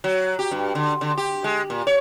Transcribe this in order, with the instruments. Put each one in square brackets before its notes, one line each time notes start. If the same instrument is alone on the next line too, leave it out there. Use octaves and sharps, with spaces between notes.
[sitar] F#3
G4
G2
D3
D3
G4
G#3
A#2
C#5